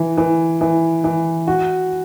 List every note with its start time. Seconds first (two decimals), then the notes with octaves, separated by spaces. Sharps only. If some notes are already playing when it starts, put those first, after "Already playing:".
Already playing: E3
0.17 E3
0.61 E3
1.04 E3
1.48 F#4